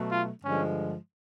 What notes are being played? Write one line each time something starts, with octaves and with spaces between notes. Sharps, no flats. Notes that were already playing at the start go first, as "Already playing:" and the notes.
Already playing: B2 F#3 A3
F4
G2 D3 F3 G#3 C#4